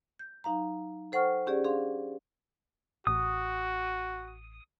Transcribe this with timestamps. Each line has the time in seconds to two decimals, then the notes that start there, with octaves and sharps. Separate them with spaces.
0.19 G6
0.44 F#3 D#4 F5 A#5
1.12 A4 C5 F#5 G5 C#6 F6
1.47 C#4 G4 G#4 D5
1.65 D4 G#4 F5 C6
3.07 A1 F#4 D#6